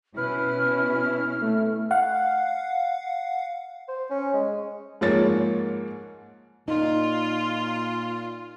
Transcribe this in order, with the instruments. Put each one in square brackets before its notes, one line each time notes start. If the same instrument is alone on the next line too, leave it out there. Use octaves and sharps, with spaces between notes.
[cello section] B2 C#4 E4 [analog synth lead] B4 [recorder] F6
[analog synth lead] A3
[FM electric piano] F5 F#5
[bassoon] C5
C#4
G#3
[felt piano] G#2 F3 A#3 C#5 A6
[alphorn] A#2 [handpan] D#4 [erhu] F4